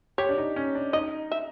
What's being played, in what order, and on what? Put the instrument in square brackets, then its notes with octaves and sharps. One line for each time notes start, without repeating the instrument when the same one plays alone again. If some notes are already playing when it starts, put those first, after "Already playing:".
[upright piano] G4 [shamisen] C#5
[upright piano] D4
D#4
C#4
D4
[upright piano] D#4 [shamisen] D#5
[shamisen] E5